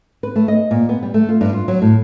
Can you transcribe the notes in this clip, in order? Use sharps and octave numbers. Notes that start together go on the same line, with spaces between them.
B4
A3
D#5
A#2
B3
G3
A3
F4
G2
F4
F#3
A2